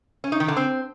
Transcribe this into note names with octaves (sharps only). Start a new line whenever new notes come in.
C#4
D#4
D#3
D3
C4